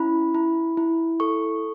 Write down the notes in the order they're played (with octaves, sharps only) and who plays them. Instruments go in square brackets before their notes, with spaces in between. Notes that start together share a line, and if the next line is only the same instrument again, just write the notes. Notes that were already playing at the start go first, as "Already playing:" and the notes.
Already playing: [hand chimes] C#4 E4 B5
E4
E4
A4 C#6